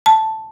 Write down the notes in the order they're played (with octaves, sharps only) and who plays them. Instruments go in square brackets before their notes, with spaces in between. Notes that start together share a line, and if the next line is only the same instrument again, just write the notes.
[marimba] A5